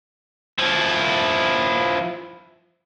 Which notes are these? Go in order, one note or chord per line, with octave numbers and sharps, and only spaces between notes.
F3 E4